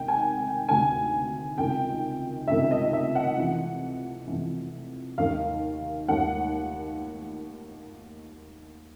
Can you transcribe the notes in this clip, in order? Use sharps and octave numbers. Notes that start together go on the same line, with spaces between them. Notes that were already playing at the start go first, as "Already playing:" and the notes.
Already playing: C3 D#3 G5
G#5
G5
D2 C3 D#3 G#5
C#2 C3 D#3 G5
C#2 C3 D#3 E5
D#5
E5
F#5
F2 C3 E3
F2 C3 E3
D#2 D#3 F5
D#2 D#3 F#5